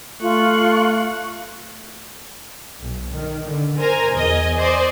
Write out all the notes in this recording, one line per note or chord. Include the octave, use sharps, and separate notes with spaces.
A3 F4 C#6 F#6
B1
D#3
D3
A#4 C5 G#5 A#5
E2 D#5 G#5
C5 D5 D#5 G#5